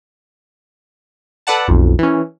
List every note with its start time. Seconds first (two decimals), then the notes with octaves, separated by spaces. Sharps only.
1.47 A4 B4 D5 F#5 A5
1.68 B1 F2
1.99 E3 C#4